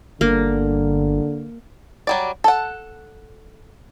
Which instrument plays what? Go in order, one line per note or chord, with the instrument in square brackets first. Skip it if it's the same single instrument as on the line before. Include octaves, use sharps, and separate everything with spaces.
[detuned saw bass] G1 [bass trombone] D3 [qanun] A#3
[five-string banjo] F#3 G3 D5
A4 F#5